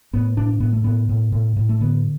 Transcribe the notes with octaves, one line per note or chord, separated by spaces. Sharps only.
A2 B3
A2 D4
D4
A2 B3
A3
A2 B3
A2
A2
A2
A3
D3 B3